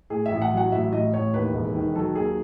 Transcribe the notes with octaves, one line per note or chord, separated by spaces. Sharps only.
A2 G#4
E5
A1
F#5
F#3
F#5
A1 E5
A2 D#5
A1 C#5
D#2 B4
E1
D#3
F#3 A4
D#2 G#4